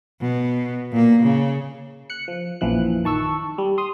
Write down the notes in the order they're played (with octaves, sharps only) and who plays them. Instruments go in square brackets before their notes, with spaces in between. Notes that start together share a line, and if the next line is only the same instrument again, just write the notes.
[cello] B2
A#2 A#3
C#3
[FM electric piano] F#6 C#7
F3
A#1 F#2 E3 F3 F#6
D#3 A5 C#6 E6
G3
C6 D#6